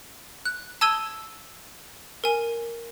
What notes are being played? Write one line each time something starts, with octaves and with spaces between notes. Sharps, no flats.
F#6
A5 D#6 E6 G#6 D#7 G7
A#4 G#5